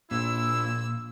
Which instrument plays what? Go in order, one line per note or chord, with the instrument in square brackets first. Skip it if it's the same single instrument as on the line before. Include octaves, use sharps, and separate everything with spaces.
[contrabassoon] A#1 [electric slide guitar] A#2 [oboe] E4 [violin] E6